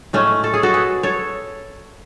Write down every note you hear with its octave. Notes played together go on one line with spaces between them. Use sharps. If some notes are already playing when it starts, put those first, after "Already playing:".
A2 G#3 A3 C#4
A4
G#4
F#4 A4
G#4 B4
A4 C#5